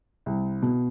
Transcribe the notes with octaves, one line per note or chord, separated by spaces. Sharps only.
C2
B2